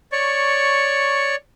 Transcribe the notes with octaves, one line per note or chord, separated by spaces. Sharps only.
C#5 D5 C#6